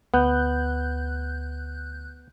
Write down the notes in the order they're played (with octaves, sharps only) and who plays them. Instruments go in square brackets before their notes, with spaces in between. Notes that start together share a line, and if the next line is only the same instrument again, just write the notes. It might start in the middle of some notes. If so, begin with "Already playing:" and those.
[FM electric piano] D2 F#6 G6 [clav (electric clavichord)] B3